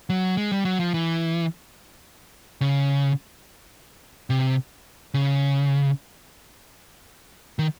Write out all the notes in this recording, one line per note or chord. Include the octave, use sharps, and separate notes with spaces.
F#3
G#3
G3
F#3
F3
E3
C#3
C3
C#3
D#3